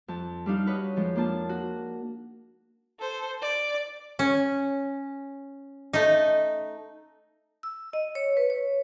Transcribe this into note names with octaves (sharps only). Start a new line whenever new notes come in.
F2 A5
G3 D4 D#4 F5
F#4 B4 C#5 D#5
F2 F3 G#3
A#3 D4 F4 A5
F#4
A4 C5
D5
C#4
A3 D#4
E6
D#5
C#5
B4
C#5